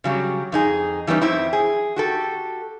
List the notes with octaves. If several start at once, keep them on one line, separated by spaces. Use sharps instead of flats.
C#3 F#3 G3
F2 D#4 G#4
E3 G3 B3 C#4 D#4
F2 C4 E4
G#4
F#4 G4 A4